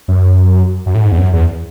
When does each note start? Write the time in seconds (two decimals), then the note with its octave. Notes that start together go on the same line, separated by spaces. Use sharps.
0.08 F#2
0.86 F#2
0.95 A2
1.02 G#2
1.12 E2
1.18 F#2
1.33 E2